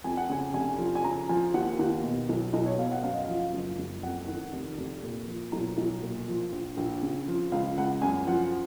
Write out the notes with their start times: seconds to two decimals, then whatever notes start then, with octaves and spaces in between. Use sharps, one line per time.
0.04 F2 G#5
0.17 F#5
0.29 C#3 G#5
0.54 F1 G#5
0.78 F3
0.95 G#5
1.04 C#3 A#5
1.29 F3 G#5
1.54 D#2 F#5
1.79 D#2
2.04 B2
2.29 B1
2.53 B1 D#5
2.66 C#5
2.78 B2 F5
2.91 F#5
3.03 F#2 F5
3.14 D#5
3.25 F3 F5
3.53 F#1
3.78 F#1
4.03 F2 F#5
4.28 D#3
4.53 F1
4.77 F1
5.03 A#2
5.27 F3
5.52 B1 A#5
5.78 B1
6.02 A#2
6.28 F3
6.52 A#1
6.77 A#1
7.03 C#3
7.28 F3
7.52 C#2 F5
7.78 C#2 F#5
8.02 F#2 G#5
8.27 F3 F#5